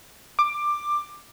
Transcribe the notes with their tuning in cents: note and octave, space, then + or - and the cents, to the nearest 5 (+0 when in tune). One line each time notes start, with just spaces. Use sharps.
D6 +15